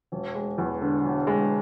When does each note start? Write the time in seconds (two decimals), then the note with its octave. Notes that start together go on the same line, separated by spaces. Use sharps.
0.12 E1
0.35 G#3
0.58 E2
0.81 D3
1.04 E1
1.27 G#3